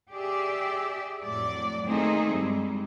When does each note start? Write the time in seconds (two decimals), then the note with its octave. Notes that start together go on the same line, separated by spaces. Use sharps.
0.11 G4 G#4 D5 E5
1.24 F2 A2 F#3 D5
1.86 D#3 A3 A#3 C4 D#4 G#4
2.31 G2 G3 G#3